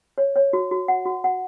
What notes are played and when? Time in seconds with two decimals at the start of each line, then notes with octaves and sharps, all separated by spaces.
0.18 C#5
0.36 C#5
0.53 F#4
0.71 F#4
0.88 F#5
1.05 F#4
1.24 F#5